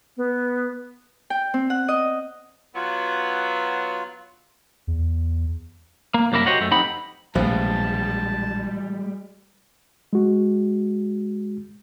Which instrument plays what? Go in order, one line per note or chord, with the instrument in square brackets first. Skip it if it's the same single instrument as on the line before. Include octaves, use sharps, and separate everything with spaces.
[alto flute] B3
[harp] G5
C4
F#5
D#5
[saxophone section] F#3 B3 [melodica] F4
[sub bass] E2
[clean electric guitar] A#3
C2 F#2 A#3 E4 A#4
F#4 G4 C5 C#5 D#5 F#5
F#2 A3
F3 C4 D#4 G4 F#5 B5
[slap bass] A#1 C3 [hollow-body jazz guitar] A2 E3 F3 [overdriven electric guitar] G3 G#3 [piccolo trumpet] A5
[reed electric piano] G#3 F#4